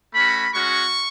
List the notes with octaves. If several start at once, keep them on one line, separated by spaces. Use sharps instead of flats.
A3 C#4 F#4 B5
G#3 C#4 F#4 C#6